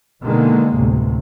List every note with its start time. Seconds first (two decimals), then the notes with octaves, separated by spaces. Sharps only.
0.22 B2 D3 D#3 G#3 A#3
0.76 A1 D2 C3